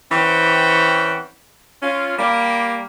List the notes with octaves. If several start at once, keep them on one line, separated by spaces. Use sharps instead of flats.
E3 C4 C#4 F#5 G5
C#4 F4
G3 A#3